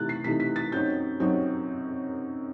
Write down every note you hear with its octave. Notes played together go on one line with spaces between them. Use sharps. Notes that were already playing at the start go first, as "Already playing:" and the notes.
Already playing: C3 E3 A3 D#4 F#6 A6
C7
C3 E3 A3 D#4 B6
B6
A6
F#2 F#3 C4 D#4 G6
F#2 F#3 C4 D#4